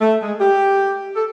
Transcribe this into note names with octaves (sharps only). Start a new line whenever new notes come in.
A3
G#3
G4
A4